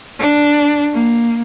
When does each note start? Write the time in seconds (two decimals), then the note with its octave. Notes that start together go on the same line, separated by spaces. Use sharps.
0.19 D4
0.93 A#3